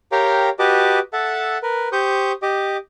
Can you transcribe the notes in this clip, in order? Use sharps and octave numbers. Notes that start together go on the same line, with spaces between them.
G4 A#4 C#5 F5 G5 A#5
F#4 G4 B4 D#5 A5 D6
A4 E5 F#5 A5
A#4 B4
G4 C5 C#6 D#6 G6
G4 D#5 D6